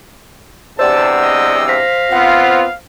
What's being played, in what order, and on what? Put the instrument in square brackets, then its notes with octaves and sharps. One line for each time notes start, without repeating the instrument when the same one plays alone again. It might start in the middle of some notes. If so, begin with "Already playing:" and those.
[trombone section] E2 G2 C3 [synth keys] C5 D5 F#5 [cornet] A5 [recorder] E6
[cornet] D#5
[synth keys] C5 A#6 B6 [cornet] F5
[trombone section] B3 C4 F4 [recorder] F#5